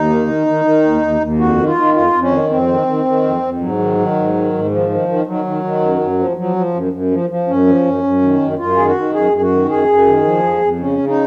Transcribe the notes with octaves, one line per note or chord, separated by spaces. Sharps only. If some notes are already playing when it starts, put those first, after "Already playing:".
Already playing: D#2 D#4
D#3
D#3
D#3
D#3
D#2
D#2
D#2
F2 F#4
D#3
F4
D#3
F2 F4
F2
C#4
D#3
F2 C4
D#3
D#3
D#3
F2
F2
G#2 F#3
D#3
D#3
G#2
D#3
G#2
D#3 F3
D#3
D#3
D#3 F#3
D#3
D#3
F#2
F#2
F3
F3 F#3
F3
F#2
F#2
F3
F3
F#2 C#4
F3
F#2
F#2
D#3
F#2
F#2 F4
D#3 G#4
F#4
D#3
F#2 G#4
F#2 G#4
F#4
D#3
F#2 G#4
F#2
D#3
F3
F2
F2
C#3 C#4
C#3
D#4